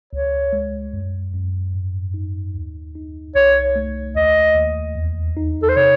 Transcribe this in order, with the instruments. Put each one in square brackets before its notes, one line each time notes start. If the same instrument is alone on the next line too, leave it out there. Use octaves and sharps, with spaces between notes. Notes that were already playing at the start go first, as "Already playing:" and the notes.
[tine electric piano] C#2 [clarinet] C#5
[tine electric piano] G#3
F#2
F#2
G#2
D#4
D#2
D#4
[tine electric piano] C2 [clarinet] C#5
[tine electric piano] A3
[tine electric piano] D#2 [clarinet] D#5
[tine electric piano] D#2
E2
D#4
[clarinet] A4
C5
[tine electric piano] C3 [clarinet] C#5